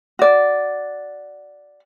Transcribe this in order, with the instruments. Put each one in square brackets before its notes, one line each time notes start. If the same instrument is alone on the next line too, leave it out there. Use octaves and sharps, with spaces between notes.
[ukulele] F#4 D5